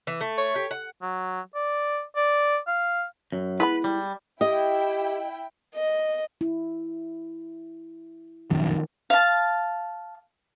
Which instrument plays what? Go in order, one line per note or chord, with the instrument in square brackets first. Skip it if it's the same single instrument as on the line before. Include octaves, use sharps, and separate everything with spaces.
[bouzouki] E3
A3
[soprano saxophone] C#5
[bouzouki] G4
F#5
[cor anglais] F#3
D5
D5
F5
[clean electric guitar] F#2
[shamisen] G#3 B3 B5 [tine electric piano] E4 [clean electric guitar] B4
[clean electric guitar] G3
[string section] E4 G5 [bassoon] G4 [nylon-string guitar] D#5
[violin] D#5
[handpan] E4
[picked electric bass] F1 A#1 F#2 [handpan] D#3
[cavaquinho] F5 A5